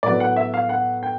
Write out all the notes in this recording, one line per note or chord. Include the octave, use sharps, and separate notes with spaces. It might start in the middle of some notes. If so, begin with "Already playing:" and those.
A2 F#3 B3 D5
F#5
E5
F5
F#5
G5